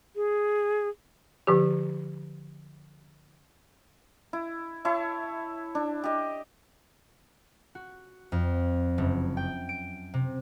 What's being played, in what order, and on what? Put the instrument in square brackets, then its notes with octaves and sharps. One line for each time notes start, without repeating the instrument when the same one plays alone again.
[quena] G#4
[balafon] D3 F3 G4
[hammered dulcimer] E4
E4 C#5 E5 A5
D4
G4 D#5
[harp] F#4
F2
F#1
G5
D7
C3